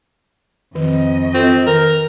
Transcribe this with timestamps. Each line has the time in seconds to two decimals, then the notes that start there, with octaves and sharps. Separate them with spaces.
0.75 F2 D#3 D#5
1.34 C4 F4 A4
1.67 D#3 A#4